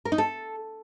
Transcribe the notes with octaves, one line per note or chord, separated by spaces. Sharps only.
A#4
D#4
A4